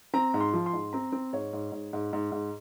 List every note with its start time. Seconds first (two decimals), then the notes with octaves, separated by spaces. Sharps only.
0.14 C4 A#5
0.34 G#2
0.41 C6
0.53 F3
0.66 C6
0.73 G#2
0.93 C4 A#5
1.12 C4
1.33 G#2 C#5
1.53 G#2
1.72 G#2
1.93 G#2
2.13 G#2
2.32 G#2